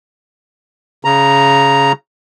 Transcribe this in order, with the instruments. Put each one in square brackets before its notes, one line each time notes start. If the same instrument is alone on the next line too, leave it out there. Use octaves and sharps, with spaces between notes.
[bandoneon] C#3 A#5